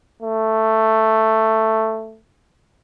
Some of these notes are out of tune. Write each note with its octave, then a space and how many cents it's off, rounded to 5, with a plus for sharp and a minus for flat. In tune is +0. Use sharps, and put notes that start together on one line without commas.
A3 +5